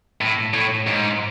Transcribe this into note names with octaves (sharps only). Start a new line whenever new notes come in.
A2
A2
G#2